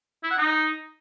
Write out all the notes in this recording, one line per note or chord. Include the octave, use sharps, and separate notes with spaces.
E4
F#5
D#4